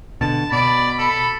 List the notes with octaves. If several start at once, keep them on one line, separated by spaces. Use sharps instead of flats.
B2 D3 A5
B2 D5 B5
A4